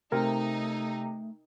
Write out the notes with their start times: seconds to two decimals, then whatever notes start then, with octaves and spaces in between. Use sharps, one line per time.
0.12 C3 A3 D#4 A#4